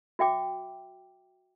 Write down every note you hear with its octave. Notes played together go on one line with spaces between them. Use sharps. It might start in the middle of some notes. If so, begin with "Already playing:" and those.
F#4 E5 G5 D6